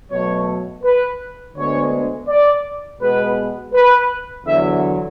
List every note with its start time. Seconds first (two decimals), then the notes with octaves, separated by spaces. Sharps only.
0.10 B2 F#3 A3 C#5
0.83 B4
1.56 D2 D3 G#3 B3 C#5
2.28 D5
3.00 B2 G#3 B3 B4
3.73 B4
4.46 E2 D3 F#3 E5